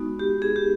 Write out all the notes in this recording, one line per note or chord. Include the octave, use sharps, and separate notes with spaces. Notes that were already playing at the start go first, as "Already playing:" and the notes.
Already playing: G#3 B3 D#4 F#4
G4
G#4
G4